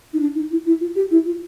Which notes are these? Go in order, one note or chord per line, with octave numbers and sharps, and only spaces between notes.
D#4
D4
D#4
E4
E4
F4
G4
E4
F4